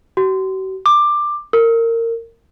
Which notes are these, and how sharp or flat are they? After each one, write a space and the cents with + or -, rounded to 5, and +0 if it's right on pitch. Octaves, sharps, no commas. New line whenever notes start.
F#4 +45
D6 +15
A#4 -25